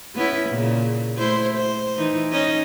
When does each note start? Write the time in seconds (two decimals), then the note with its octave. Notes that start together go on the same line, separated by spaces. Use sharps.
0.15 B3 C#4 E4
0.49 A#2 C#3
1.18 A3 E4 C5
1.58 C5
1.97 E3 D#4
2.32 C#4 D#4 D#5